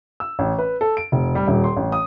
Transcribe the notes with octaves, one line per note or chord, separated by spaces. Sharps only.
E6
A1
B4
A4
D7
F1
G3
D#1
C6
A1
D#6